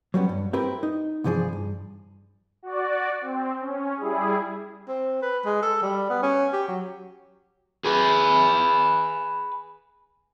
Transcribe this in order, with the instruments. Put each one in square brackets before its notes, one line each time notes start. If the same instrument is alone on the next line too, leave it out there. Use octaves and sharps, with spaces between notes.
[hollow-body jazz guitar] F#3 G3 B3 C#4
G2
C4 E4 G4 A#4 B4
D#4
C2 G2 E3 F3 G#4
G2
[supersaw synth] F#4 D5
C4
C#4
G3 E4 G#4
[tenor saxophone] C4
B4
G#3
A4
G3
B3
C#4
G4
F#3
[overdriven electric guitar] G#4 B4